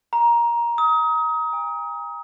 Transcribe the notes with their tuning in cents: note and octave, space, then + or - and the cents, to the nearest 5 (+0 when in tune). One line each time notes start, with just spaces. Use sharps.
A#5 +15
D#6 +30
G#5 -40